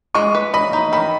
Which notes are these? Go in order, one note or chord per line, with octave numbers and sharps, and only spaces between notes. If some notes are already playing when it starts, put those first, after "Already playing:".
G#3 C#6
B4
D#5 B5
D#4
D#3 B5